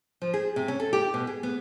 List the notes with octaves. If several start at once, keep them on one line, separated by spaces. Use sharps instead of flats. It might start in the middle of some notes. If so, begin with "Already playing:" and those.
F3
G#4
C3
C#4
A4
G4
B2
G#4
B3